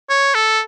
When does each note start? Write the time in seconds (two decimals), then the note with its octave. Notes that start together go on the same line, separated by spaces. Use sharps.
0.10 C#5
0.34 A4